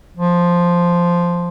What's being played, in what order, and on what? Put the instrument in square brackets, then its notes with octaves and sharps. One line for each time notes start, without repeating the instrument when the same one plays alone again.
[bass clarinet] F3